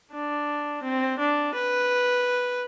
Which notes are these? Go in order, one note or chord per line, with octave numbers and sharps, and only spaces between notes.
D4
C4
D4
B4